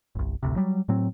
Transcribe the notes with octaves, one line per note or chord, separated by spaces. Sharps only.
G1 C2
A1 D2 C3
F#3 G3
A2 F#3 C4